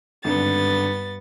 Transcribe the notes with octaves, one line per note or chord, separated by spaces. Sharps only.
G#1 G2 D3 B3 A6